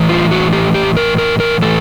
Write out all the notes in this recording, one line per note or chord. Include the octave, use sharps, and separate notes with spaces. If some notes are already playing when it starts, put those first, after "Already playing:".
Already playing: A2 E3
F4
F#4
G4
G4
A#4
A#4
A#4
A2 E3 A4